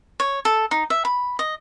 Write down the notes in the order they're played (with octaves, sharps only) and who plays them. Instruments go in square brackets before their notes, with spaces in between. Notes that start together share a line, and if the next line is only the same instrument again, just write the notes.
[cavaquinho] C#5
A4
D#4
E5
B5
D#5